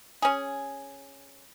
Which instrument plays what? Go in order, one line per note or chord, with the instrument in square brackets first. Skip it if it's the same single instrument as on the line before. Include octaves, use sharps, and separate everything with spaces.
[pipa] C#4 G#4